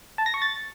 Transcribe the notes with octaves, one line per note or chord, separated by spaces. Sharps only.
A5
A#6
C#6
A6